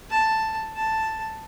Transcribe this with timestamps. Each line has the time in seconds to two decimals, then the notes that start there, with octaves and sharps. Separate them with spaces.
0.10 A5
0.76 A5